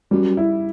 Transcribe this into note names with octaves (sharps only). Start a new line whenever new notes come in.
F#2 G3
E4